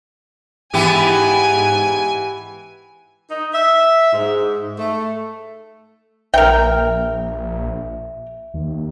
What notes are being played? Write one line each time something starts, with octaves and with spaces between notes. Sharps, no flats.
G#2 E3 B3 G4 G#5
D#4
E5
G#2
A3
A#1 A#4 E5 G5
D#2